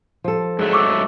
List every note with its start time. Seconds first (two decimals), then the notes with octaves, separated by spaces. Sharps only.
0.24 F3 A4
0.59 G#2 F#3 A3 G#4 E5
0.73 C#6 D6 E6